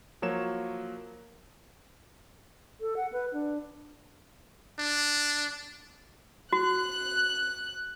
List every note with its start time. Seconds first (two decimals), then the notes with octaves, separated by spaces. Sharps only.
0.22 F3 F#3 A#3 C#5 E7
2.81 A4
2.97 F#5
3.13 B4
3.33 D4
4.79 D4
6.53 F#4 F#6